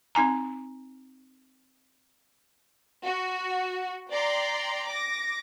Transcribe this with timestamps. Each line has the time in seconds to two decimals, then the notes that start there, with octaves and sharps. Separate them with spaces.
0.15 C4 D#4 G#5 A#5
3.05 F#4
4.11 D5 G5 A#5 C6
4.88 D6 A#6